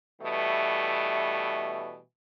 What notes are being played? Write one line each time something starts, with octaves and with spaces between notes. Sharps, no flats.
B2 E3 G3 A3